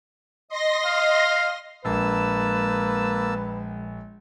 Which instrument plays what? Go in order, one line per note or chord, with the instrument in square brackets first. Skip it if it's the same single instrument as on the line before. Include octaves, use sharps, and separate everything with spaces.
[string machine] D#5 C6 A#6
[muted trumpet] F5
[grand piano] A#1 [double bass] G#3 [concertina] A#3 A5 E6 [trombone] B4